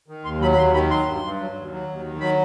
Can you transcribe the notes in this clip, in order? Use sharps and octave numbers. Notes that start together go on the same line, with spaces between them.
D#3
D#2 C6
F#3 B5
B5
D#2 C6
D#3 B5
F#3 C6
G2
G2
F#3
D#2
F#3
D#2
D#3
F#3 B5